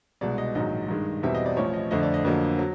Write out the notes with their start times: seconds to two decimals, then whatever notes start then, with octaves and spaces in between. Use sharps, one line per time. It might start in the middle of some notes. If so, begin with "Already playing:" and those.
0.21 C2 B2 G#3 D5
0.38 D#5
0.55 A#1 G#2 D#3 F#3 D#5
0.88 G2 D#3 G#3
1.23 E2 B2 G3 C4 E5
1.35 D#5
1.46 D5
1.57 A1 A2 F3 C#5
1.73 D#5
1.91 F2 D3 F3 A3 D#5
2.03 D5
2.14 D#5
2.25 F2 D3 F#3 A#3
2.59 F#3